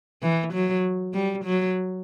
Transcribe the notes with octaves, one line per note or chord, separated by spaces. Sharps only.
E3
F#3
G3
F#3